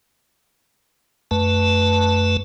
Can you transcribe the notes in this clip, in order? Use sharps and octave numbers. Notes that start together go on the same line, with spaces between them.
F#2 A3 B4 A5